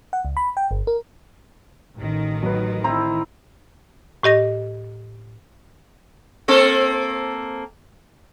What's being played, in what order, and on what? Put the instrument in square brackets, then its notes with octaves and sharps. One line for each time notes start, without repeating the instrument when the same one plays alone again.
[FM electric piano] F#5
C#2
B5
G5
G1
A#4
[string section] A1 D#3
[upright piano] F#3 B4
[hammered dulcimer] C4 E4 [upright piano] A#5
[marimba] A2 G4 D#5 A#6
[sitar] A#3 C4 A4